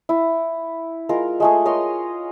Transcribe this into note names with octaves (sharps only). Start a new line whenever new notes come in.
E4
G#3 F4 A#4
G#3 A3 G#4
A#4 C#5 D#5 C6